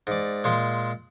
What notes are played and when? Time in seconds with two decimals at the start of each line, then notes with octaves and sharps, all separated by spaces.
0.07 G#2 D5
0.44 A#2 G#3 C6